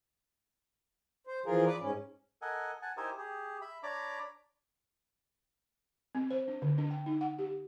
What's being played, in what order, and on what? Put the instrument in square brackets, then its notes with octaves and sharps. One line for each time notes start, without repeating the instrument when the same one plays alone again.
[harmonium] C5
E3 F3 F4 G#4 A#4
B4 D5
G#2 C#4
[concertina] A4 A#4 D#5 F#5 G#5
F#5 G#5 A5
D#4 E4 G4 A#4 C5 G#5
G4 G#4
E5 B5
D4 C#5 D5 A#5 B5 D6
[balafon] C4
C5
D4
D3
D4
G5
D#4
F#5
G4